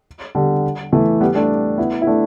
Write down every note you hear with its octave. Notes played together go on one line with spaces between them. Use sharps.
D3 G3
E3 A3
G3 B3
A3 D4
B3 E4
E4
A3 D4